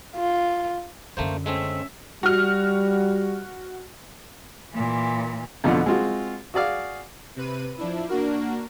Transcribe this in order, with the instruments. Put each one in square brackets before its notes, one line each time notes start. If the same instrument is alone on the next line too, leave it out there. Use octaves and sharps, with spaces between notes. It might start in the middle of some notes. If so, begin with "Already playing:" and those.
[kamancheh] F4
[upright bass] F#2 D3 [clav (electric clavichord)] A3 A#3 C5
[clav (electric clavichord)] G#3 A3 C4 [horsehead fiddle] C#4 E5
[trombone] G3 [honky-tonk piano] F#4 F6
[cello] A#2 E3
[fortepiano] F2 B2 D3 F4
G#3 C4 F4 F#4
F#4 G#4 D5 F5
[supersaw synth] C3 B4 D#7
F3 D4 E4
A#3 D4 F#4 A#4